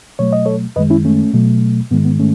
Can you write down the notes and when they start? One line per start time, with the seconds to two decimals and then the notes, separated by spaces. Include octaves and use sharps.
0.19 B2 F#3 A3 C#5
0.33 D#5
0.46 A4 C#5
0.76 F#2 D#3 G#3 B4 D#5
0.90 C#4 E4
1.05 A3 C#4
1.34 B2 F#3 A3
1.91 G#2 D#3 G#3 B3
2.05 B3
2.19 A3 C#4